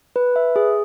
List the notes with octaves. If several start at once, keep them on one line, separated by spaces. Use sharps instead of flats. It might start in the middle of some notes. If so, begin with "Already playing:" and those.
B4
E5
G#4